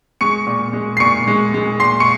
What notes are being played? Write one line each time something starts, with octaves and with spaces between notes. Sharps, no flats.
G#3 C#6 C#7
A#2
G#3
C7
A#2 C#6 C#7
G#3
G#3
A#2 C6 C7
C#6 C#7